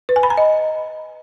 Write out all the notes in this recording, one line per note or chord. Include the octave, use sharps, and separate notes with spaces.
B4
G#5
B5
A#5
D#5